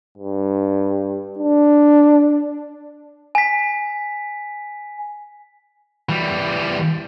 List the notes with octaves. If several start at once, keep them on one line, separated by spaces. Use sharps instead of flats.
G2
D4
G#5 B6
E3 G3